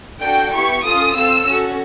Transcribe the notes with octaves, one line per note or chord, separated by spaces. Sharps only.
D4 F#4 A4 G5
B3 E4 G4 C#6
C#4 F4 A4 D#6
C4 F4 A4 E6
C#4 F#4 A4